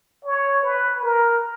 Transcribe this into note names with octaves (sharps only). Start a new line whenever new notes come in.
C#5
B4
A#4